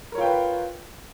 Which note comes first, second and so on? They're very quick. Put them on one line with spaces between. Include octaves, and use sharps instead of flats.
A#4 C#5 F4 G5 B4